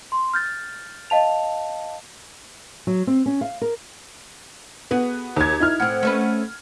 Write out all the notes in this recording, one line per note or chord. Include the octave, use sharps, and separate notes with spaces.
C6
F6 G6 A6
D#5 F5 A5 F7
F#3
C4
C#4
F5
A#4
B3 F#4 G#4
D#2 G#6
D#4 E4 F6
A2 C4 F#5
A3 C#4 B4